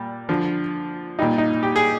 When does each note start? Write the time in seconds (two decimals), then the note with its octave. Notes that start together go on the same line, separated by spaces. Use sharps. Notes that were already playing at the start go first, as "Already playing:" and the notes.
Already playing: A#2 G3
0.29 D3 F3
1.19 A#2 G3 D#4
1.38 D#4
1.63 G4
1.76 G#4